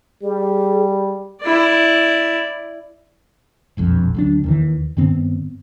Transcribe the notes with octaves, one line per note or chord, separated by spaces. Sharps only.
G3 G#4
E4 D5
E1 A#1 F2
D2 F#3 D4
D#2 D#3 E3
G2 D#3 B3 C4